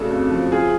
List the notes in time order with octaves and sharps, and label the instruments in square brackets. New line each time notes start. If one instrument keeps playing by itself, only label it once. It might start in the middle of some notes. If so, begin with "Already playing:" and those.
Already playing: [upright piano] C#3 A3 D4 [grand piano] F#4 A4
[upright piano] F2
F3
[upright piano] F4 [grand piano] G#4